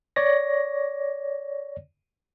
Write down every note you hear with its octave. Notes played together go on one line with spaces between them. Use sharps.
C#5 D5 A#6